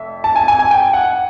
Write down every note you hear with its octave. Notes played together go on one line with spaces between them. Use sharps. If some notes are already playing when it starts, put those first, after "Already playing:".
Already playing: F1 F2 E5
A5
G#5
G#5
G#5
G5
F#5